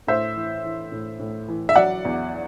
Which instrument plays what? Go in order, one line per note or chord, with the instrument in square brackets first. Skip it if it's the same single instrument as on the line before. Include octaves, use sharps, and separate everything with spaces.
[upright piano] A2 C5 E5
E3
E3
A2
A2
E3
E5
F#3 D5 F#5
E2